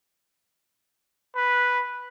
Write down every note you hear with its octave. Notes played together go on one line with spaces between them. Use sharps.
B4